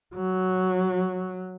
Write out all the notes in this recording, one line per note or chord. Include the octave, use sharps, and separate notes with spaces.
F#3